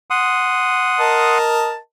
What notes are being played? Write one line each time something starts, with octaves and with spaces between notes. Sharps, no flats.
F#5 C6 D#6
A#4 D#5 A5